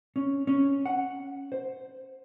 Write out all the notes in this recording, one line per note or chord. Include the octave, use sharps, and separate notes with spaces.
C#4
C#4
F#5
C5